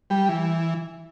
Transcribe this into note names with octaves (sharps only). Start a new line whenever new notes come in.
G3
E3